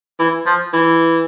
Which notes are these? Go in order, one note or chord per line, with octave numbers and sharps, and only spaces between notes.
E3
F3
E3